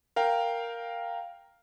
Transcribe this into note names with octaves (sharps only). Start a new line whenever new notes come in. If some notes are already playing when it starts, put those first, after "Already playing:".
A#4 F5 G5